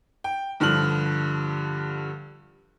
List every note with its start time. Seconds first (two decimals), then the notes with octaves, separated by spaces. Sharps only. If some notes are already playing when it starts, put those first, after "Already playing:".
0.24 G5
0.60 G2 D3 F3 F6 F#7